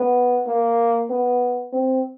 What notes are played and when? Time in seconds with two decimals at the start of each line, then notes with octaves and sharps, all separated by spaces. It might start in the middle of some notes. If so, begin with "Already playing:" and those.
Already playing: B3
0.47 A#3
1.10 B3
1.72 C4